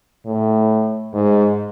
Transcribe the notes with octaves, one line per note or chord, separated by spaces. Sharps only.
A2
G#2